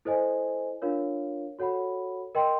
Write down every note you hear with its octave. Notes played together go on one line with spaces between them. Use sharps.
E4 A4 C5 D#5 G#5
D4 F4 A#4 C#5 F5
F#4 A4 C#5 F#5 B5
A#4 D#5 G5 C6